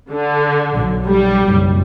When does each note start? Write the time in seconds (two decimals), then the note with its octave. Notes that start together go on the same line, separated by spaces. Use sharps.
0.11 D3
0.74 B1
1.06 G3
1.46 F#1 B1